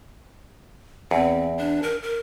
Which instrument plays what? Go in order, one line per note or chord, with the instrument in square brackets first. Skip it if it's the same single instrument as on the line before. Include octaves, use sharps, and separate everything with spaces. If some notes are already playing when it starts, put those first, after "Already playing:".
[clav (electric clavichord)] E2 [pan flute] C4
[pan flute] D4
A#4
A#4